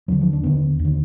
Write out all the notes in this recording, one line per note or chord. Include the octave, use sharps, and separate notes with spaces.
D#2 D3 F#3
F3
D4
D#2 D3 B3
D#2
D3